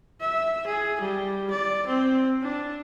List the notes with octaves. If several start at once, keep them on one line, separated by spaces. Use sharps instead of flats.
E5
G#4
G3
D5
C4
D4